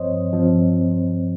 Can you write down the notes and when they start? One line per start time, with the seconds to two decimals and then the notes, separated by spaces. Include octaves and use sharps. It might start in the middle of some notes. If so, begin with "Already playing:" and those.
Already playing: G2 F3 C4 C5 C#5 D#5
0.33 G2 F3 C4